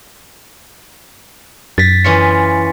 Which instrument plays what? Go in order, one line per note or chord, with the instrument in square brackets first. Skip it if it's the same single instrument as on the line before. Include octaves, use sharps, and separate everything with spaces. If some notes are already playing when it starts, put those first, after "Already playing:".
[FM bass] F#2 [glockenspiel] A6 B6
[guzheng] E3 C#4 F4 [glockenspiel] C#7